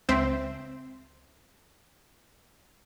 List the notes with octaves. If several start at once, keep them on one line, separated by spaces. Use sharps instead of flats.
C#2 C4 C5 E5